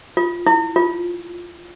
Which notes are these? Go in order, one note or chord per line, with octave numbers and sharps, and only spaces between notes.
F4
E4
F4